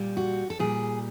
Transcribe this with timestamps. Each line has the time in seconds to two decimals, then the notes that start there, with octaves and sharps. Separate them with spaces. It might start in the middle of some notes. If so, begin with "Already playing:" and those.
Already playing: A#2 G3
0.17 F#4
0.50 A4
0.59 A#2 G3 G#4